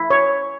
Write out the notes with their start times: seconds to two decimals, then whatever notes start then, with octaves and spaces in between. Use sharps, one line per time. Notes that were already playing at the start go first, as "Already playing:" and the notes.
Already playing: E4
0.10 C#5